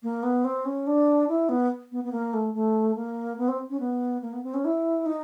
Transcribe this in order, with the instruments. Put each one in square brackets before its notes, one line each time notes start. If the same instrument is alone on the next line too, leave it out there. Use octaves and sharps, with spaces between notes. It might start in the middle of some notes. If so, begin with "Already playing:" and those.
[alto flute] A#3
B3
C4
C#4
D4
E4
B3
B3
B3
A#3
A3
A3
A#3
B3
C4
C#4
B3
A#3
B3
C4
C#4
E4
D#4